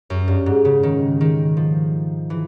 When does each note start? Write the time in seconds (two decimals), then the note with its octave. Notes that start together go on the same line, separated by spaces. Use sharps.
0.10 F#2
0.28 G2
0.46 G#2
0.65 C#3
0.83 D#3
1.21 D#3
1.57 F3
2.30 E3